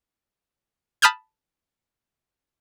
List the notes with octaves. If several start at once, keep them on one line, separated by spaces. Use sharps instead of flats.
A5 B5 D#6 F6 G6 G#6